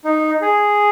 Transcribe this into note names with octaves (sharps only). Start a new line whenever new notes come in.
D#4
G#4